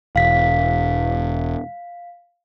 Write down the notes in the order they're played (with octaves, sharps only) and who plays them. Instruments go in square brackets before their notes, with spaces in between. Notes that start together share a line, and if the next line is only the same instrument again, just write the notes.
[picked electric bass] E1 [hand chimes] F5 B6